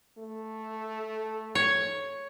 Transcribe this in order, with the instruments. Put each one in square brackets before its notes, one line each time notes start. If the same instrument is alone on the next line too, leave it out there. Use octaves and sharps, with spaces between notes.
[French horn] A3
[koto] C#5